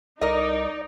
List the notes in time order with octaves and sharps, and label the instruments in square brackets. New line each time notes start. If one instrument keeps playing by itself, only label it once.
[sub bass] C2 [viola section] D#4 [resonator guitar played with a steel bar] A#4 D#5 [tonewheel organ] D5